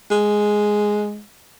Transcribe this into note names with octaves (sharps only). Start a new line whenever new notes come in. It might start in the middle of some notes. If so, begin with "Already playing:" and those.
G#3